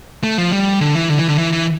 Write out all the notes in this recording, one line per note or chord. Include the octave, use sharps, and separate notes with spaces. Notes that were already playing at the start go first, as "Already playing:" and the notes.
A3
F3
G3
D3
E3
D3
E3
D3
E3
E3